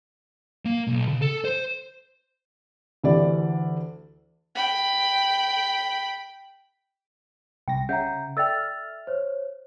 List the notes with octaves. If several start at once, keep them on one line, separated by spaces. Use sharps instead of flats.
A#3
B1
C#3
A4
C5
D2 E3 E4 G4 D5
G5 B5
C2 G5 A#6
C#3 E5 F#5 A#5 G6
A4 D5 E5 G5 E6 F6 A6
C5 C#5